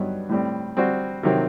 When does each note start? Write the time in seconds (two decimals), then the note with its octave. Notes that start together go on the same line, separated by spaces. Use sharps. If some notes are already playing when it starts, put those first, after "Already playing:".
Already playing: G2 F#3 B3 D#4
0.29 A2 G3 C4
0.77 G3 C4 F#4 C5
1.23 C3 D#3 F#3 C4